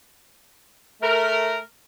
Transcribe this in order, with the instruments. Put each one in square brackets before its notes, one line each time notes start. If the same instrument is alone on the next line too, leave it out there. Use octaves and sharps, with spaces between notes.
[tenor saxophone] A3 [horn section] A#4